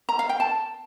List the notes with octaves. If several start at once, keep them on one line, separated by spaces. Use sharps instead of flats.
A#5
F5
G5
A5